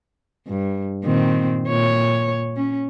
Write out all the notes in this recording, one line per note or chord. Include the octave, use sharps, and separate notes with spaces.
G2
A#2 D#3 C4
A#2 C#5
C#4